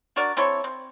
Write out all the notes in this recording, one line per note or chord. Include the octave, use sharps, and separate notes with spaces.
D4 F#4 A#4 D5
C4 E4 A4 C#5
C4